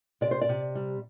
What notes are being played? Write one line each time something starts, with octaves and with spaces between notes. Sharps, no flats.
C3 D5
C5
D5
C3
G3